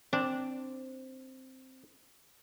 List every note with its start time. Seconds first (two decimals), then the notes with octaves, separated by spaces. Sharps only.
0.13 C4 D4